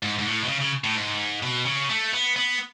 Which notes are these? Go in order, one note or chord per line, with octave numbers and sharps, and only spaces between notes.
G#2
G#2
A2
B2
C#3
C#3
A2
G#2
B2
C#3
A3
B3
B3